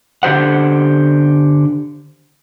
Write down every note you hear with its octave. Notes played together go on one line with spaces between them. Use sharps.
D3 G4 C5 F#5